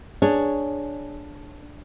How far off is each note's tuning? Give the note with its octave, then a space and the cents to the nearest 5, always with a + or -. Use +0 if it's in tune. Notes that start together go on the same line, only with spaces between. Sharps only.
D4 +0 G#4 +0 C#5 +0